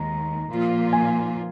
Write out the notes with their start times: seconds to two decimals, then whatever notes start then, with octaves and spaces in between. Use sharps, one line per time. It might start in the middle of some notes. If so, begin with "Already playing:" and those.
Already playing: D#2 D#3 G#3 A#5
0.49 A#2 F3 A#3 F4
0.93 G#5